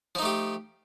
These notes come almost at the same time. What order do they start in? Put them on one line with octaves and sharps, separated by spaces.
F3 D#4 A3 G4